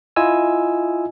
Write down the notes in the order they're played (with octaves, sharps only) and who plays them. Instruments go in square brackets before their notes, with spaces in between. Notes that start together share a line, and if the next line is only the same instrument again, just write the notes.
[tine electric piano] E4 F4 D#5 G#5 E6